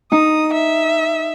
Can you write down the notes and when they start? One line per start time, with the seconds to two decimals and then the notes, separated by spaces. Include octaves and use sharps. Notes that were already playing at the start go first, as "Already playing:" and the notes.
0.12 D#4 D#6
0.53 E5